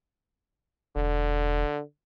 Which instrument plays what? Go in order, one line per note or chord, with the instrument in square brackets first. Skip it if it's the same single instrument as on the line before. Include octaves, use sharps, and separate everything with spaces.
[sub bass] E1 [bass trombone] D3